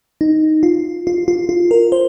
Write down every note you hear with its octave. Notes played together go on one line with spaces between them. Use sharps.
D#4
F4
F4
F4
F4
A#4
C5